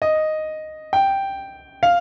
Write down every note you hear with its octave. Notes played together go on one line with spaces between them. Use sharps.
D#5
G5
F5